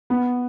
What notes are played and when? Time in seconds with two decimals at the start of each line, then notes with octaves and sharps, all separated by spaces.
0.10 B3